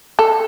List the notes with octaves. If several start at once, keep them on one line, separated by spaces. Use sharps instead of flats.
A4